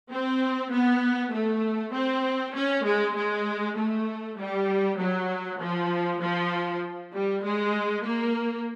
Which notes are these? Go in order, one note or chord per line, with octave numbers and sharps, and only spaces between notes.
C4
B3
A3
C4
C#4
G#3
G#3
A3
G3
F#3
F3
F3
G3
G#3
A#3